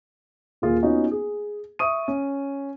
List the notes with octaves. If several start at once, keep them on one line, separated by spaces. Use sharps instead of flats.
D#1 A#3 F4 G#4
B3 C#4 D#4 F4 F#4
G#4
E5 C#6 D#6 D#7
C#4